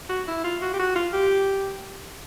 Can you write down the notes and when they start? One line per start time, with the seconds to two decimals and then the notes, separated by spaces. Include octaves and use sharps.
0.09 F#4
0.28 E4
0.44 F4
0.62 F#4
0.74 G4
0.79 F#4
0.96 F4
1.13 G4